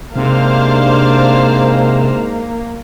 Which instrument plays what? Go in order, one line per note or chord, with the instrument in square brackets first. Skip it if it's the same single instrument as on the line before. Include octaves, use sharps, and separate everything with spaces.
[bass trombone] G#2 [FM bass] C3 [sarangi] A#3 [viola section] D4 C5 F5